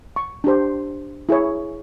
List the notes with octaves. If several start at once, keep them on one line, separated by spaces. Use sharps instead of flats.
C#6
D4 G4 C5
E4 G#4 C#5